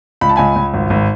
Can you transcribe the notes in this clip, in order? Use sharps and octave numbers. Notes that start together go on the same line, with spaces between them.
C#2 B5
A5
C#2 G#5 B5
C#2
G#1
G#1